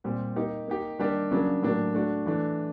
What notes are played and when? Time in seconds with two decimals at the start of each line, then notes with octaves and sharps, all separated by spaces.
0.04 A#2 G3 C4
0.36 A#3 D#4 G4
0.68 A#3 D#4 G4
0.99 D#3 G3 A#3 D4 G4
1.31 C#3 F#3 A#3 D4
1.63 A2 F#3 A#3 D4 G4
1.94 A3 D4 F#4
2.26 E3 A3 D4